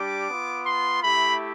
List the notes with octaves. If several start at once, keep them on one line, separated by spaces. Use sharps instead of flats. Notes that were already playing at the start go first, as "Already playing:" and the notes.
Already playing: G3 D4 G4 D6
B3 F4
C6
A3 E4 G4 B5